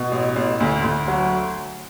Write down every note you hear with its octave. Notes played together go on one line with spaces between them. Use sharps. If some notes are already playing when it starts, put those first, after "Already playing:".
Already playing: B2
A1
A1
D2
D2
F#3